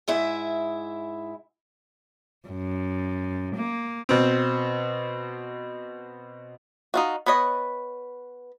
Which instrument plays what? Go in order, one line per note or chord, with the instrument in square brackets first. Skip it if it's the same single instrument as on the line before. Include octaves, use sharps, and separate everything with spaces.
[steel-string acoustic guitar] G#2 E4 E5 G#5
[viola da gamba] F#2
A#3
[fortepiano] B2 C4
[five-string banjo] D#4 F4 F#4
B3 B4 C#5 D#5